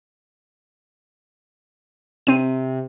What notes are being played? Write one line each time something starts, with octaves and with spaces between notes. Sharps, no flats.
C3 C4 D#7